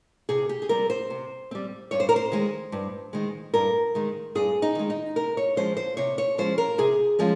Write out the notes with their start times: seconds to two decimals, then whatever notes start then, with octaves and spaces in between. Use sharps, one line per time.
0.29 C3 G#4
0.49 G4
0.62 G#4
0.69 G3 C4 A#4
0.90 C5
1.10 C3
1.51 G3 C4
1.91 G2 C#5
2.00 C5
2.09 A#4
2.16 C5
2.32 D#3 G#3
2.72 G2
3.13 D#3 G#3
3.54 G2 A#4
3.95 D#3 G#3
4.35 G2 G#4
4.62 D#4
4.75 D#3 G#3
4.90 D#4
5.16 C3 A#4
5.37 C#5
5.56 F3 G#3 C#4 C5
5.77 C5
5.97 C3 C#5
6.18 C#5
6.38 F3 G#3 C#4 C5
6.58 A#4
6.78 C3 G#4
7.19 F3 G#3 C#4